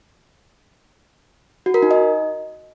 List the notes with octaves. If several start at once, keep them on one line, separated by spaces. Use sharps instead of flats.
F#4
A#4
D#4
D#5